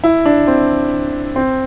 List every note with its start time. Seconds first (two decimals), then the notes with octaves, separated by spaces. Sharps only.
0.04 E4
0.26 D4
0.47 C4
1.36 C4